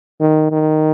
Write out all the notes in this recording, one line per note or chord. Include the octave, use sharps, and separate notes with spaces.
D#3
D#3